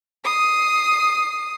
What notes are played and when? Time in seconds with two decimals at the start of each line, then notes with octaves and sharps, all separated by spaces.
0.25 D#6 C7